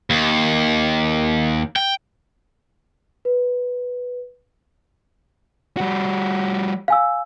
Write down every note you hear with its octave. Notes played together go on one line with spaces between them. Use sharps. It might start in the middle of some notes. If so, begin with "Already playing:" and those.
D#2
G5
B4
G3 F#4
F5 G#5 E6